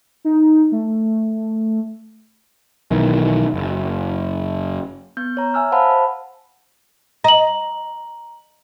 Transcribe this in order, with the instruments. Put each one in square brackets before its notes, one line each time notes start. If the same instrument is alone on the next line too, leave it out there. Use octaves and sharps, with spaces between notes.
[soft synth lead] D#4
A3
[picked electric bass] B1 D#3 E3
F#1
[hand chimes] B3 G6
C#5 A#5
E5 G#5 E6 F6
C5 F5 F#5 A5 B5
C5
[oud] D#5 [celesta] A#5 F#7